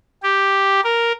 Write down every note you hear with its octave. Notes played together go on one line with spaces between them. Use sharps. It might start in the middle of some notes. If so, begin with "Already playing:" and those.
G4
A#4